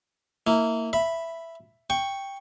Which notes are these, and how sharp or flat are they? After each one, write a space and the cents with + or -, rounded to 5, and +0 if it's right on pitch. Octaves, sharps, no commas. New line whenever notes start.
A#3 -20 E4 -20
E5 +10 B5 +0
G5 +5 C#6 +0